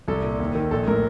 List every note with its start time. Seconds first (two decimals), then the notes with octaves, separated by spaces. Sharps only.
0.08 C2 A4
0.23 A#2
0.40 D#2
0.55 D#3
0.71 A#1 A4
0.88 A2 A#4